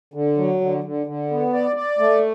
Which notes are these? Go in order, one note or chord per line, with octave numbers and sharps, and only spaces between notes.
D3
F#3
D3
D3
D3
B3
D5
D5
A3